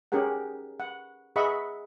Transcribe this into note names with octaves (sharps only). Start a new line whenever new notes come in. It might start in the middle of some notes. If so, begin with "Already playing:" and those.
C#4 G4 G#4 A#4 F#5
F#5
G#4 D#5 E5 F#5 B5 C#6